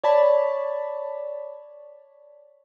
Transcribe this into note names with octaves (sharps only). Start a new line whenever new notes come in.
C#5 D5 A5 B5